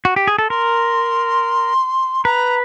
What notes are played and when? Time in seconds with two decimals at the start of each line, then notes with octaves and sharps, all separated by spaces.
0.05 F#4
0.16 G4
0.27 G#4
0.39 A4
0.50 A#4 C6
2.24 B4 A#5